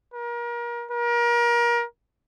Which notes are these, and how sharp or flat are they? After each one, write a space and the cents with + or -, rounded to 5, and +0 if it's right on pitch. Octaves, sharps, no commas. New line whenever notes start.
A#4 +35
A#4 +30